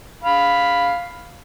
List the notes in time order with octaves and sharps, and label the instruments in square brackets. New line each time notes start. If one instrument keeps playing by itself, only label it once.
[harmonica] F5 B5